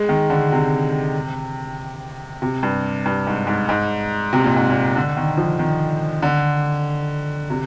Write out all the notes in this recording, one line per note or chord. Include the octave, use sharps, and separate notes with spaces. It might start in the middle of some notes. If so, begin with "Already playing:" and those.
Already playing: G#3
D#3
D3
C3
C3
G2
G2
G#2
G#2
G#2
C3
A#2
G#2
A#2
D3
D#3
F3
D#3
D3
C3